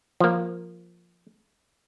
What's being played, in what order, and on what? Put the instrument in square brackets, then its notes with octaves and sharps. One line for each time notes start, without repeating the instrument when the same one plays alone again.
[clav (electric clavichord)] F3 A#3